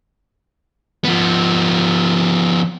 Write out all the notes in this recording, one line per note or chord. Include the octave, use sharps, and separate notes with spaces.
F3 B3